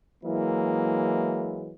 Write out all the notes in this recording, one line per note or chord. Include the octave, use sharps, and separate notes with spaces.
E3 F#3 G#3 A#3 E4